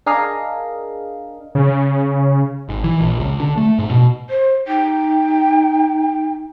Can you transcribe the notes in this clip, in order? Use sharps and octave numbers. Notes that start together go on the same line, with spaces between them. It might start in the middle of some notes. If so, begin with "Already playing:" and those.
D4 G#4 A#4 D#5 F5
C#3
G#1
E3
A#1
C#2
D3
A3
G#2
B2
C5
D#4 G5